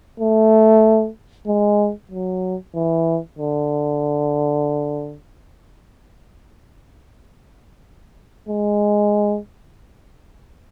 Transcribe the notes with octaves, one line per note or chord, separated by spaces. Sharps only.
A3
G#3
F#3
E3
D3
G#3